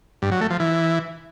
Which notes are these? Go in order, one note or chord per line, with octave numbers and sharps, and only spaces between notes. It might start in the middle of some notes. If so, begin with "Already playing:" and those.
G2
F#3
A3
F3
E3